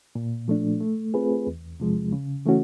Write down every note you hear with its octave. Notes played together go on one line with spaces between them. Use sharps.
A#2
F3 A3 D4
A3
C4 F4 G#4 B4
E2
C3 F3 G#3
C#3
E3 A3 C#4 F#4